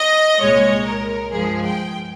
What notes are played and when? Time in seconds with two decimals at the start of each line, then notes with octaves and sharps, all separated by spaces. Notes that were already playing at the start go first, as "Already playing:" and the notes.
Already playing: D#5
0.39 C2 A#2 G#3 C#5
0.86 A#4
1.32 G2 F3 G#3 G#4
1.63 G5